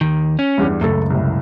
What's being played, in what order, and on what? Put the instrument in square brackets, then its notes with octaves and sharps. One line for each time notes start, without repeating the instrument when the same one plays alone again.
[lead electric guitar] D#2 D#3
C#4
[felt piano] E2 G2
[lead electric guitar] C#2 F#2 [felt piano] A3 A4
[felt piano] C2 A2